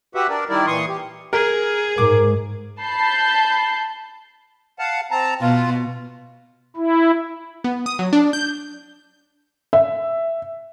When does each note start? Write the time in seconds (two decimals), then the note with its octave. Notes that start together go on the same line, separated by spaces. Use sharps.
0.15 F#4 G4 B4 E5 F#5
0.29 D4 A#4 D5
0.49 D#3 G3 E4 A#4 D5
0.67 A#2 E3 C6 C#6 D#6
0.88 G4
1.33 G#4 A#4
1.98 G#2 A#4 D6
2.81 A5 B5 G6 C7
4.79 F5 F#5 A5
5.11 C4 A5 A#5
5.41 B2 F4
6.76 E4
7.64 B3
7.86 D#6
7.99 F#3
8.13 D4
8.33 G6
9.73 E5